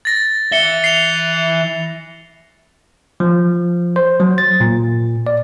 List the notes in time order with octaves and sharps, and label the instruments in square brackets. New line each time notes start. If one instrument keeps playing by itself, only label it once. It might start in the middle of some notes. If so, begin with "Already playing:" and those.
[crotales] A6 A#6
[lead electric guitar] E3 E5 [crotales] C#7 G7
[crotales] C7 F7
[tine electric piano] F3
C5
F#3
A6
A#2
D5